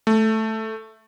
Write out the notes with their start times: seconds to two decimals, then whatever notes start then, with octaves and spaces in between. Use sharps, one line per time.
0.07 A3